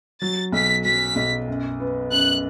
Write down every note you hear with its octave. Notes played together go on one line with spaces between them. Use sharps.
F#3 A6
B1 B6
F#3 B6
B1
F#2
B3
F#2 F#6